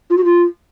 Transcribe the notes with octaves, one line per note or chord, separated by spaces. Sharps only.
F4
F#4
F4